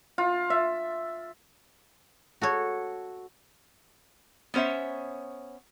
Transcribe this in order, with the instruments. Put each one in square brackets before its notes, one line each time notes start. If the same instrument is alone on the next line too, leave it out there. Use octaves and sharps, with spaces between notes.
[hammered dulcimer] F4
E5
[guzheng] F#4 A4 C#5
[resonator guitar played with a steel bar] B3 C#4 C5 C#5 E5